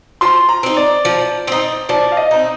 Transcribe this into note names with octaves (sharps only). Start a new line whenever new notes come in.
F3 C6
A#5
C4 D#4
D5
F3
C4 D#4
F3 D5
F5
D#5
C4 D#4